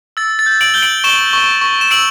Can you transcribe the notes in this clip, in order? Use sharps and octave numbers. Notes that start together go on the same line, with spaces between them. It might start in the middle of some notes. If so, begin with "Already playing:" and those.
E6 A6
A6
G6
D7 F#7
G6 G7
D7 F#7
C#6 E7 G7
C#6
C#6
E7
E6 D7 F#7